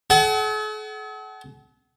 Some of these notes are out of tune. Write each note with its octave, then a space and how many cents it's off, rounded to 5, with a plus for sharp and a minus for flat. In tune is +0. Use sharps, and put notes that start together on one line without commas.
A4 -45 F#5 +35